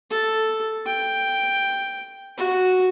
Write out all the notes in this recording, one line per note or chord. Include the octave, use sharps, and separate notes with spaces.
A4
G5
F#4